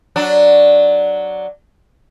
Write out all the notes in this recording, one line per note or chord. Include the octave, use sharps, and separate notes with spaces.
F#3 D4